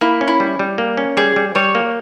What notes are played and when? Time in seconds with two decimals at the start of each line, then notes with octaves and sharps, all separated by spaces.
0.01 A#3 E4
0.21 C#4
0.28 E4
0.40 G3
0.59 G3
0.78 A#3
0.97 C#4
1.17 G3 G#4
1.36 G3
1.55 G3 C#5
1.75 A#3